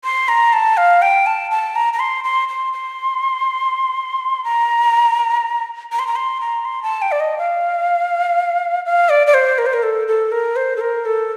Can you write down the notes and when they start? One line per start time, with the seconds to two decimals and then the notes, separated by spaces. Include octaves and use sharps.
0.04 C6
0.28 A#5
0.53 A5
0.77 F5
1.02 G5
1.26 A5
1.51 A5
1.76 A#5
1.93 A#5
2.00 C6
2.24 C6
2.49 C6
2.73 C6
4.44 A#5
5.92 A#5
5.99 C6
6.07 A#5
6.16 C6
6.41 A#5
6.65 C6
6.83 A5
7.02 G5
7.12 D5
7.20 D#5
7.38 F5
8.85 F5
9.09 D5
9.27 D5
9.34 C5
9.58 A#4
9.66 C5
9.73 A#4
9.83 A4
10.08 A4
10.32 A#4
10.56 C5
10.76 A4
10.81 A#4
11.05 A4